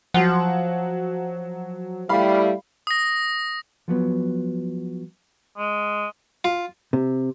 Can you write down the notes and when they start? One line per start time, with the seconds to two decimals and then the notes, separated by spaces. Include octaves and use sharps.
0.14 F3 F#3 F#5
2.09 G3 A3 E4 F5 B5
2.87 D#6 A#6
3.88 F3 F#3 B3
5.57 G#3
6.44 F4
6.93 C3